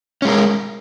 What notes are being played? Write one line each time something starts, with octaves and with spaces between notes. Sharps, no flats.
G#3 C#4 A#4